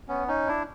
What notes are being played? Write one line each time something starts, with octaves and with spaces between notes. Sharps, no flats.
B3 C#4
C#4 D#4
D4 E4